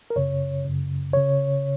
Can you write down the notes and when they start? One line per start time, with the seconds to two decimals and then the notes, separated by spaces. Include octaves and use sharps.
0.10 A#4
0.16 F#2 C#3 C#5
0.65 F#2 C#3
1.13 C#3 C#5